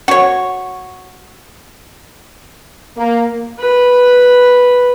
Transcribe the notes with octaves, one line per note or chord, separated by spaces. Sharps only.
F#4 C#5
A#3
B4 B5